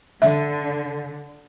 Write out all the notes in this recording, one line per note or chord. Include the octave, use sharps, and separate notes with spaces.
D3 E5